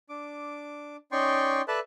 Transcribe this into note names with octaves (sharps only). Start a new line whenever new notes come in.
D4 D6
C#4 D#4 D5 G5 C6 C#6
A4 B4 D5 E5 A5 F#6